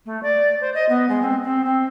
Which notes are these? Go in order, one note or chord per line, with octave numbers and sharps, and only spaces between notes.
A3
D5
C5
D#5
B3
G#3
C4
C4
C4